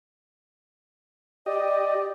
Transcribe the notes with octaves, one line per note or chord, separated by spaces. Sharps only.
G4 D5 D#5